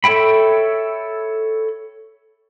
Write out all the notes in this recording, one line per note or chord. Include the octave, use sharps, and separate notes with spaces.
A4 C#5 E5 G5 B5